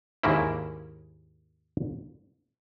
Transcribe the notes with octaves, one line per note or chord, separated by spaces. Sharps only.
D#2 G#2 G#3 A#3 C#4 E4